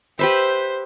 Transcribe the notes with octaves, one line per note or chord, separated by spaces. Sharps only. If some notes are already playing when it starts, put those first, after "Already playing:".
G4 B4 C5 E5